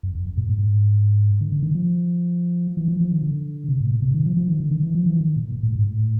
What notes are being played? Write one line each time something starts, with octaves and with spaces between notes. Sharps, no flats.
F#2
F2
F#2
A#2
G#2
D3
D3
D#3
F3
E3
F3
F3
D#3
D3
C3
A2
A#2
C3
D#3
F3
F3
D#3
D3
D#3
E3
F3
E3
D#3
A#2
A#2
A2
G#2
A2